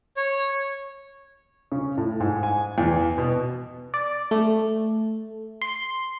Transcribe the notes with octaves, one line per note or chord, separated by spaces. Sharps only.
C#5
C#3
A2
G#2
G#5
E2
B2
D5
A3
C6